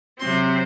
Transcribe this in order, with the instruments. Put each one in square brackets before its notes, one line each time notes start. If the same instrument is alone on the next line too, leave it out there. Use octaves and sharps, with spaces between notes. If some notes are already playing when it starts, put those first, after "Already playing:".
[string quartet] C3 F#3 C4 C6